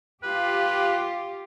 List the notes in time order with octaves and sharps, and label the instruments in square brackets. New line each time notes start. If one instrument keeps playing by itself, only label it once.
[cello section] F4 G4 [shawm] B4